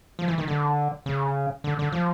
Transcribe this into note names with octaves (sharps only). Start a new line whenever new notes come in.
F3
E3
D#3
D3
C#3
D3
D3
F3